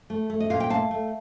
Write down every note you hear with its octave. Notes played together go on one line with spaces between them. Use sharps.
A3
A3
D#5
A#2 F5
G5
A3 F5 A5
A3